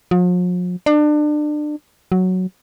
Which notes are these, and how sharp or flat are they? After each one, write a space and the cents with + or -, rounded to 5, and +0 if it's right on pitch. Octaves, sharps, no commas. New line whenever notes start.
F3 +45
D4 +30
F#3 +0